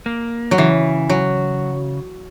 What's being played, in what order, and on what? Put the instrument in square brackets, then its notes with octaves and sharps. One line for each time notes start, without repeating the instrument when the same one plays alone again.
[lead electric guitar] A#3
[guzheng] F#3
[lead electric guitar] C#3 [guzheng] E3
[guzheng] F#3